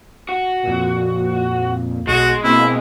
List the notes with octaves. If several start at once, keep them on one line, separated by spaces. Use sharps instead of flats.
F#4
F2 A#2
B1 G#3 F#4
B2 A#3 C4 E4